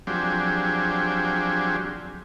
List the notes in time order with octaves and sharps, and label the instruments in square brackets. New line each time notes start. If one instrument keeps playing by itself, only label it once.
[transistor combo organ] F3 F#3 C4 D4 G4 G#4